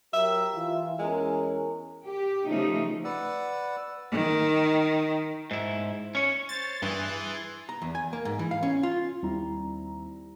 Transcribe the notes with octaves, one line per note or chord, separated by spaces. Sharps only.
F#3 G4 A#4 E5
E3 F4
E2 G#3 C#4 A#4
G4
C#3 F3 A3 D#4
B4 D5 F#5 E6
D#3
G#2 E4
C#4 C#5
C5 C#5 A6
G2 E3 G#4 C6 F#6
A#5
E2
G#5
A#3
G#2
E3
F5
C#4
F4
D#2 G3 C4 E4 A#5